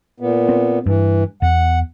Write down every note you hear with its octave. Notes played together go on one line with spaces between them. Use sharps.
A#2 B3
C4
G2 E3
E2 F#5